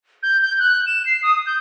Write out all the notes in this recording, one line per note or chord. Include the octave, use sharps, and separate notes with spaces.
G6
G6
F#6
E7
C7
D#6
G6